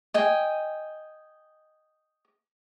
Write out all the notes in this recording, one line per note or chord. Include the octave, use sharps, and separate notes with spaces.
D#5 G5 G#5